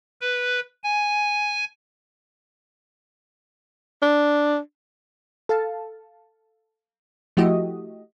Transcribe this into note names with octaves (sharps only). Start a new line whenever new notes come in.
B4
G#5
D4
A4 F5 A5
F3 A3 E4 F#4 G4 D#5